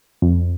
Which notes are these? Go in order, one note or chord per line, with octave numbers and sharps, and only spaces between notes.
F2